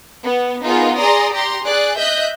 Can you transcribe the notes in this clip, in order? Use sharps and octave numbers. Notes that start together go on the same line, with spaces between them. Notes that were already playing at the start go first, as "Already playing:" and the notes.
B3
B3 D#4 F4 G#4 A#4
G#4 D5 A#5 C6 D#6
G4 A#5 C6
G#4 D5 F#6
D#5 E5 F#6 G6